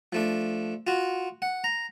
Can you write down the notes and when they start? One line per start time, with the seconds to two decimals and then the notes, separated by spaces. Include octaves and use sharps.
0.13 F3 A3 D4
0.87 F4 F#4
1.42 F#5
1.64 A#5